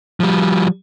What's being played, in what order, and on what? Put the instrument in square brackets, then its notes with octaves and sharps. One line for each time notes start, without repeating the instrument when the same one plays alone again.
[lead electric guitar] F3 G3